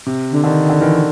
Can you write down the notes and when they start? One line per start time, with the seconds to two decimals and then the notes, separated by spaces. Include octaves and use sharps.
0.06 C3
0.32 D3
0.44 D3 D#3
0.70 D3
0.81 D#3 E3